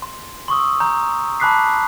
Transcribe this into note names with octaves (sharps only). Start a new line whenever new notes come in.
C6
C6 C#6 D#6 E6
A#5 G6
A5 B5 D6 F#6 B6 C7